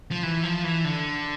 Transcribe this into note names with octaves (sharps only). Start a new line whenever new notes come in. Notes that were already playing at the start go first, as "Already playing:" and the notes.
F3
E3
F3
E3
D3